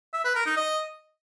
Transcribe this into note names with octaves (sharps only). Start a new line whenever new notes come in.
E5
B4
A#4
D#4
D#5